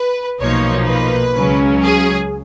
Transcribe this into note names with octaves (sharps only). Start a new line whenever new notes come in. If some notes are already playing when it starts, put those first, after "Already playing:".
Already playing: B4
B1 A#2 F3 A#3 D#4 C#5
B4
C#2 C#3 F#3 C#4
G#4